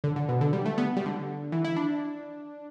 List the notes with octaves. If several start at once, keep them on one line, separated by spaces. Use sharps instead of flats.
D3
D3
B2
D3
G3
A3
B3
G3
D3
E3
E4
D4